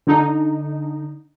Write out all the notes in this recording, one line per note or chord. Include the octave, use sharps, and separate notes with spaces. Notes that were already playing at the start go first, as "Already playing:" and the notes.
D3 D#4